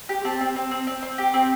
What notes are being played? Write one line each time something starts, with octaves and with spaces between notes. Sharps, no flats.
G4
C4 A5
C4
C4
C4
C4
C4
G4
C4